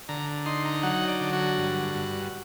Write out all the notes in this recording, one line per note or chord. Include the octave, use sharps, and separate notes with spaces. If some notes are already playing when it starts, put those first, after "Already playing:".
D3 A#5
D#4 C6
A#5
F#3 F#5
D5
D3
F#4
G2
G2